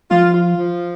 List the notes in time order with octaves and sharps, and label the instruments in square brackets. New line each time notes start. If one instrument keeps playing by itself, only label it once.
[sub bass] F3 [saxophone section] F4
[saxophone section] F4
F3